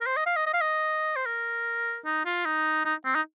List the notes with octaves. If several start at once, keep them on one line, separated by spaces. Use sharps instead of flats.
A#4
C5
D#5
F5
D#5
D#5
F5
D#5
C5
A#4
D#4
F4
D#4
D#4
C4
D#4